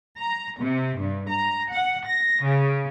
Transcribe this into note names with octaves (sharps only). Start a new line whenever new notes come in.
A#5
C3
G2
A#5
F#5
A#6
C#3